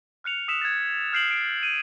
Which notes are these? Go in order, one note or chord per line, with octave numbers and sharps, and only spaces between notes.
F6 F#6 C#7 F7
D#6 E6 B6 E7 F7
G#6 A6
F6 G6 C7 D7 F#7
D7
D#7